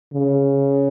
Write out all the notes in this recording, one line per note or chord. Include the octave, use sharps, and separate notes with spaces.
C#3